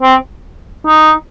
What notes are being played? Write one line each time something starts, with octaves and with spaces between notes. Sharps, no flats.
C4
D#4